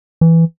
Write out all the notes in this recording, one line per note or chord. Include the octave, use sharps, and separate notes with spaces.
E3